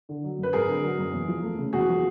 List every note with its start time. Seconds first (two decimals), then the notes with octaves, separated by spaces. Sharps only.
0.09 D3
0.24 F#3
0.38 F#2
0.43 B4
0.53 G#1 G#4 A#4
0.68 D3
0.83 F#3
0.98 F#2
1.13 E2
1.28 F3
1.43 A3
1.59 C#3
1.73 E2 F#4 G#4
1.89 F3